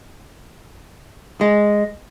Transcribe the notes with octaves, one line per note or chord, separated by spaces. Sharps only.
G#3